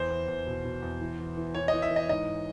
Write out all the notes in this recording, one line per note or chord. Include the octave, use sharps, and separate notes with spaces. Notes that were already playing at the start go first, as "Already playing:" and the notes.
Already playing: E2 C5
E2
E2
B2
B2
E2
E3
E3
E3
E3 C#5
E3 D#5
E5
E3
D#5
G#2 D#5